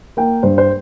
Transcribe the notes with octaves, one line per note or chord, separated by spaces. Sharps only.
A#3 G5
G2 C5
C5